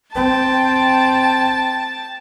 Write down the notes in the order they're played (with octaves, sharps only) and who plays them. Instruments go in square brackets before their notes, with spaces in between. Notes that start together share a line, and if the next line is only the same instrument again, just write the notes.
[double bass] C4 [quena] G5 [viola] A5